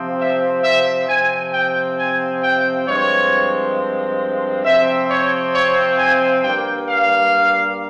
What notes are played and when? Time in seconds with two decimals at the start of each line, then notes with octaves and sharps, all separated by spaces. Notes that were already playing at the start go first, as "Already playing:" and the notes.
Already playing: C3 F3 C4
0.20 E5
0.64 E5
1.09 C3 F3 C4 G#5
1.53 G5
1.98 G#5
2.43 G5
2.87 G2 F3 G#3 C4 C#5
4.65 C3 F3 C4 E5
5.10 C#5
5.54 C#5
5.99 G#5
6.43 G2 G3 A#3 G5
6.88 F5